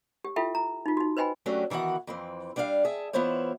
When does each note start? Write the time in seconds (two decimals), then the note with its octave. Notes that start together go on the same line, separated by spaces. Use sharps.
0.24 G4
0.36 E4 F4 A4 E5 G5
0.55 A#5
0.86 D#4 F4
0.97 D#4 F#4
1.17 B4 C5 D#5 G5 G#5 B5
1.46 F#3 A3 C#4 D4 F#4 G4
1.70 D#3 E3 B3 F#4 F#5
2.07 F2 E3 C4
2.56 G3 D4 D5 E5 F5
2.85 G#4 E5 A5
3.13 E3 B3 E4 F4 C5 C#5